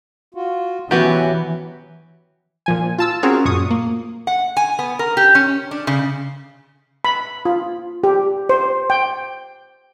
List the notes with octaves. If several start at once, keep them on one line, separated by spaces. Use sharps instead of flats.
F4 F#4
E3 F#3 B3 C#4 E4 F#4 G4
A#2 F3 G#5
F4 A5 E6
C4 C#4 F4 F#4 G#4 A#4
F#2 A#2 C#6 D#6
A#3
F#5
G#5
B3
A#4
G4
C#4
D4
C#3
B5
F4
G4
C5
G5